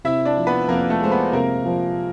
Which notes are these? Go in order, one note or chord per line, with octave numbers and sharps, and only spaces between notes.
C3 E4 E5
D4 D5
F3
B3 B4
F2 A#3 A#4
A3 A4
G#3 C5
B3 B4
C3 A#3 A#4
F3